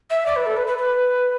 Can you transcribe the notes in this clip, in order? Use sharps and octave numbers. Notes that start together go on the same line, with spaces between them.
E5
D5
B4
A4
B4
B4
B4